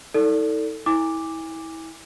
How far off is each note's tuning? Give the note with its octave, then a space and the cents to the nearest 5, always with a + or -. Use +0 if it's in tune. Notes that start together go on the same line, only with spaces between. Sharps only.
D#4 +45 A4 +15 D5 -20
E4 -30 G#5 -30 D6 +0